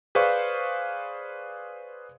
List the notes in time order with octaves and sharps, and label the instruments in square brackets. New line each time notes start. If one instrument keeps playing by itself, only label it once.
[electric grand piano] G#4 B4 C5 D5 F5 C#6